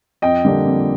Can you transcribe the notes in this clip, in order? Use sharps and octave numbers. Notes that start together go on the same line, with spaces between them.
F2 D#5 G5
D3 G3 A#3 D4
F2